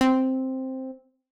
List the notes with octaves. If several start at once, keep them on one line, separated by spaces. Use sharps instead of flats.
C4